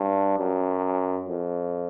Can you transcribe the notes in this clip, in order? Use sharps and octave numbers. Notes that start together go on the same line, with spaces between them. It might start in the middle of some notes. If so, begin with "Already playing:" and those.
Already playing: G2
F#2
F2